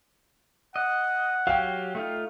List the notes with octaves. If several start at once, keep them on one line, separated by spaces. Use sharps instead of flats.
D#5 F#5
F#3 G4 F5 G5
A3 D#4 F4